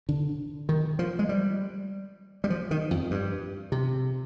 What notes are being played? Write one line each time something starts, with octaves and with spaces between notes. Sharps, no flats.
D3
D#3
F3
G#3
G3
G3
F3
D#3
F2
G2
C3